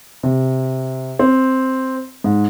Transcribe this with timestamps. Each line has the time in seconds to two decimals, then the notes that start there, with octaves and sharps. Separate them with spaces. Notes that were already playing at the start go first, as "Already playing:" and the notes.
0.23 C3
1.19 C4
2.24 G#2